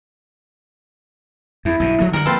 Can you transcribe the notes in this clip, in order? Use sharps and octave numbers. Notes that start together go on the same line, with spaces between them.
E2 E4
B1 G2 B2
F3 G3 A3
D3 E3 G3 A#4 F#5
F3 G#3 A#3 C4 F4 A4 B4